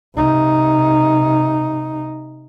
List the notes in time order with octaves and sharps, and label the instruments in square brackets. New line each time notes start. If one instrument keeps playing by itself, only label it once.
[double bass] C3 D#4